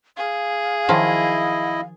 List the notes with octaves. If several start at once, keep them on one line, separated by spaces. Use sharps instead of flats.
G#4 F5
D#3 F3 F#3 E4 D#5